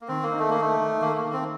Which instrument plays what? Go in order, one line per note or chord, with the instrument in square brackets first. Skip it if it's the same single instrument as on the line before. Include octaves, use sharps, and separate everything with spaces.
[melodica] A#3
[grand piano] D#3 [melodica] C4
[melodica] A#3
[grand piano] D#4
[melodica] A3
[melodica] A#3 [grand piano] D#4
[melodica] A3
[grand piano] D#3
[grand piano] D#3 [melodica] A#3
[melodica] A3
A#3
[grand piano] D#3
[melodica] C4